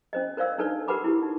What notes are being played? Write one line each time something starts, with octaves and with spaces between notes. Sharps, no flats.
C#4 C5 D#5
A#4 C5 D5 F5 E6
D4 D#4 A4 B4 C#5 D5
G4 A#4 B4 F#5 B5 D6
E4 G4
D#4